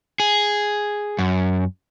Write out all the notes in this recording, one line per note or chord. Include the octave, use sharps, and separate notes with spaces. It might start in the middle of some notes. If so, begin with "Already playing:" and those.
G#4
F#2